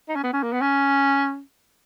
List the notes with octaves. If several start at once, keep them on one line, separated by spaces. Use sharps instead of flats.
D#4
C#4
B3
C#4
A#3
B3
C#4